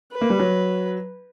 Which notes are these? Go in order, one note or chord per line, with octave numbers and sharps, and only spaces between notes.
B4
A#3
G3
F#3